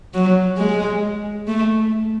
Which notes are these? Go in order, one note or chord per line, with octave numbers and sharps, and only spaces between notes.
F#3
G#3
A3